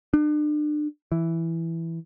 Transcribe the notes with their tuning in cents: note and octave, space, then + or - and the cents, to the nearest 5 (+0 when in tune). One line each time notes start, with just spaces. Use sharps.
D4 +35
E3 +5